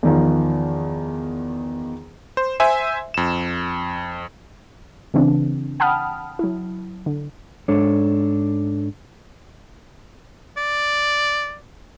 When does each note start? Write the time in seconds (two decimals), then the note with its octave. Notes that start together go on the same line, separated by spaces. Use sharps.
0.03 E2 D#3 F3
2.37 C5
2.60 C5 E5 G#5
3.14 F2 E7
5.14 C#3 E3 C4 D4
5.80 F#5 G5 A5 B5 D#6 F6
6.39 F#3 E4
7.06 D3
7.68 G#2 D4 A4 C#5
10.57 D5